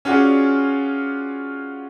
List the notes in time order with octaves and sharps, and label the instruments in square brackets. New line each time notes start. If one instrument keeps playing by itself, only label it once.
[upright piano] C#4 F4 F#4 G#4 D5